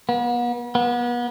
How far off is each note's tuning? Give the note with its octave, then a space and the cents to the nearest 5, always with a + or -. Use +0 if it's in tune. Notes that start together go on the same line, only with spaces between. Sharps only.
B3 -40
B3 -35